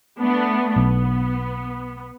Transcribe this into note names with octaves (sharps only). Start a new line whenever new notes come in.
A3 B3 D4
B1 B3